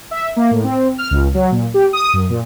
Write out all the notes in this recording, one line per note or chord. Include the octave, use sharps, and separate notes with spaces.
E5
A#3
A2
C4
F6
C#2
F#3
A#2
G4
D#6
F#2
A#2